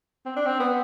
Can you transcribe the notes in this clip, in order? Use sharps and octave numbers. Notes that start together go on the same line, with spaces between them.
C4
D4
C4
B3